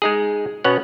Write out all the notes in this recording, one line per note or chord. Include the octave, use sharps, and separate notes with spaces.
G#3 D#4 G#4
B2 B3 C#4 C#5 F#5